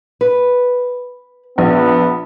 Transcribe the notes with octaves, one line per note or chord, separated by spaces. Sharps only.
B4
A#1 B3